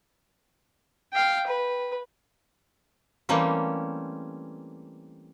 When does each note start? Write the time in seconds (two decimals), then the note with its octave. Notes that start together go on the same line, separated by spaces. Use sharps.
1.13 F5 G5
1.47 B4
3.29 E3 G3 A3 A#3 C4 C#4